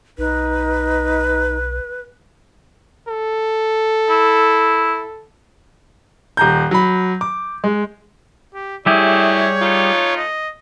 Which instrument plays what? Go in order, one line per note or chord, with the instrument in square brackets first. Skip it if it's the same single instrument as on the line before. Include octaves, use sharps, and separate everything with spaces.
[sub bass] B1 [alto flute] D#4 [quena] B4
[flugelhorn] A4
[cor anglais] E4
[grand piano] D#1 A#5 G6
F#3 B5
D6
G#3
[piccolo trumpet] G4
[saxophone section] F#3 A3 E4 [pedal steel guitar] G3 G4 G#4 [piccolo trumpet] C#5
[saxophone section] A3 D#4 F4
[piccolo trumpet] D#5